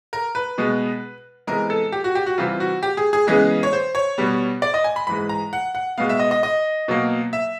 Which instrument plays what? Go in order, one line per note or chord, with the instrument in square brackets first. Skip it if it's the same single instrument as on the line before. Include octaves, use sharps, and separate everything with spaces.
[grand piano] A#4
B4
B2 G#3 B3
C3 E3 G#3 B3 A#4
A4
G4
F#4
G4
F#4
C3 E3 G3 F4
F#4
G4
G#4
G#4
C#3 E3 G#3 B3 G#4
C#5
C5
C#5
B2 G3 B3
D5
D#5
G#5
B5
G#2 E3 G#3 B5
A#5
F#5
F#5
B2 G#3 B3 F5
E5
D#5
D#5
D#5
B2 F#3 A#3
E5